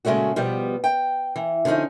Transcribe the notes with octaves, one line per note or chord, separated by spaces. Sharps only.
A#2 C#3 G#3 A3 C#4 F#4
B2 F3 G3 B3
G5
E3
D3 F3 G3 C#4 D#4